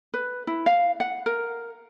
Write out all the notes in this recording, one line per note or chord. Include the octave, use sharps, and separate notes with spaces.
B4
E4
F5
F#5
A#4